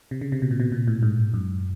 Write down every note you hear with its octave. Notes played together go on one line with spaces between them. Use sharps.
C3
C#3
C3
B2
A#2
B2
A#2
A2
G#2
F#2